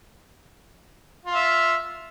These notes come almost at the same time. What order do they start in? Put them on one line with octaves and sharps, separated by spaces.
F4 F5 E5